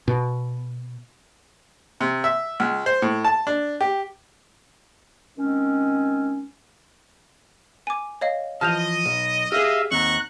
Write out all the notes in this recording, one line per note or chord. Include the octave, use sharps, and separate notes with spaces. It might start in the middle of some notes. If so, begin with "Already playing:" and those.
B2
C3
E5
C#2
C5
A2
A5
D4
G4
D#3 G#3 C4 C#4
G#5 D6
C#5 D#5 F5
E3 F3 D#5 A5 F6 G6 F7
B1
G4 G#4 E5 F5
D#2 C4 F#5 A#5 C#6 F#6